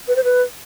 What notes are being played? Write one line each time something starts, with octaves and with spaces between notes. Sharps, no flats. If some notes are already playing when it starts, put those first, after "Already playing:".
B4
C5
B4